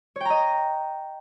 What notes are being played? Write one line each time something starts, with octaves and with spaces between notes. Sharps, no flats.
C#5 D#5 G5 A#5